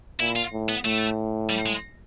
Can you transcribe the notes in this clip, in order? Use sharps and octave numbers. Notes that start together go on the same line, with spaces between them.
A#2 E4
F4
A2
B3
A2 A3
G3
G#3